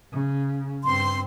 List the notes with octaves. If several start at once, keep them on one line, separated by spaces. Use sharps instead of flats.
C#3
G2 C4 C6